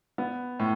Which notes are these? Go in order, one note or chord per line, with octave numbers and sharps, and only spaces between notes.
B3
A2